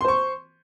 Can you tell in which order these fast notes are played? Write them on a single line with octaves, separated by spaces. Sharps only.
C6 C5 C#6